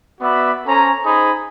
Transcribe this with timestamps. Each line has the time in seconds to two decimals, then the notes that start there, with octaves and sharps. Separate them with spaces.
0.21 B3 F#4 D5 E5 B5 D6
0.67 C#4 A4 C5 G#5 A#5
1.04 D#4 G#4 C5 G#5 B5 D#6